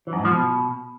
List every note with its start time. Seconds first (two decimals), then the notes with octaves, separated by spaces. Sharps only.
0.07 E3
0.13 F#2
0.19 G#2
0.25 F3
0.31 B2